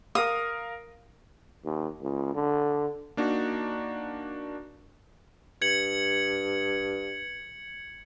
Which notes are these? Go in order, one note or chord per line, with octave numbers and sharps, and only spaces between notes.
A#4 F5 D#6
D#2
C#2
D3
A#3 D4 D#4 F#4
G2 G#6 C#7 F#7